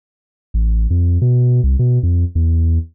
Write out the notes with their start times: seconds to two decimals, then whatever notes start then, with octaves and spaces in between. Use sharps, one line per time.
0.54 A1
0.90 F2
1.22 B2
1.64 C2
1.79 B2
2.03 F2
2.35 E2